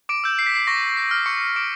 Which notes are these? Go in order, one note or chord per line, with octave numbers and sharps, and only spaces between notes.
D6 D7
E6 G6
C7
B6
C7
C#6 A#6
C7
F6
C#6 C#7
D6 D7